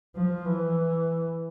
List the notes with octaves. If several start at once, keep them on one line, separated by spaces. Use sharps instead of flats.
F3
E3